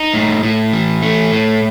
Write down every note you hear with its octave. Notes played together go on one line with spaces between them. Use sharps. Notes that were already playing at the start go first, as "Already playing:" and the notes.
Already playing: D#4
A2
A2
E3
A3
A2